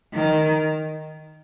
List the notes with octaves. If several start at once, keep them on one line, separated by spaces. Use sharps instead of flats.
D#3